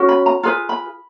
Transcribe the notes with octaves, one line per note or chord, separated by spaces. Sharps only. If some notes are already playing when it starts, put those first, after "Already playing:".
Already playing: C#4 F#4
B5
A#5
F4 G#4 B4 A#5
B5